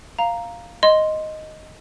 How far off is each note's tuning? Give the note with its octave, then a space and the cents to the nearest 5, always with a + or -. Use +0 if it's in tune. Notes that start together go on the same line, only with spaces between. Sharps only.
F5 +0 A#5 +0
D#5 +0 C6 +0